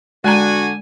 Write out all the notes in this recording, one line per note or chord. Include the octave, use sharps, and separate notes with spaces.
D3 G#3 D4 F#4 G#5 A#5